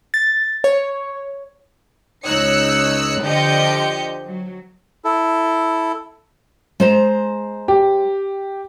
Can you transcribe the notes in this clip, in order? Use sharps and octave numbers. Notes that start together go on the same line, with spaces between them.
A6
C#5
C#2 D#4 C#5 E6 F#6 C#7
D3 F3 G4 D#5 G6 C#7
F#3
E4 A4
G#3 C5 A#5
G4